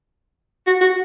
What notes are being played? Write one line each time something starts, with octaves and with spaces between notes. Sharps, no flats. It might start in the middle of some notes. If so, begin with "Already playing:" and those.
F#4
F#4